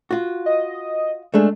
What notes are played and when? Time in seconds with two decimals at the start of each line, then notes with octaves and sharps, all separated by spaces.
0.11 F4 F#4
0.46 D#5
1.34 G#3 A3 D4